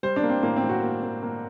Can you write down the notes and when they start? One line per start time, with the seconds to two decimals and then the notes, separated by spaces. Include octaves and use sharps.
0.03 G3 C5
0.16 D4
0.23 A#3
0.30 C4
0.43 A2 A#3
0.56 C4
0.63 A2
0.69 F#4
0.83 A#3
1.03 A#3
1.23 A#3